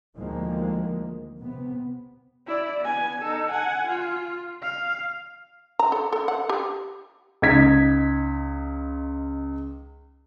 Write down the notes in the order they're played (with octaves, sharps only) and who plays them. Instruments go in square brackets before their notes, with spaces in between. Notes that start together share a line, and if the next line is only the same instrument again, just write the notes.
[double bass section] D2 D#3 F3 G#3 A#3
C3 B3
[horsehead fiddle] E4 D5
B3 G#5
D#4 A4
F#5 G#5
F4
F5
[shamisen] A#5
A4
A4
F#5
G4
[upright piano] C#2 D#4 G#6 B6